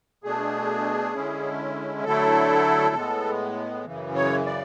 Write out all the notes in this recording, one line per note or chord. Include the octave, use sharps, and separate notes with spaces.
B2 A3 D4 G#4
D3 G#3 C#4 E4
D3 F#3 A3 E4 A4
A2 G#3 B3
F#2 C#3 E3
C#5
D5